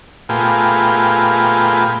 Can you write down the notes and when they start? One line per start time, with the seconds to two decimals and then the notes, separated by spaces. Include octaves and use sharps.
0.29 A#2 A3 B3 F4 G4 G#4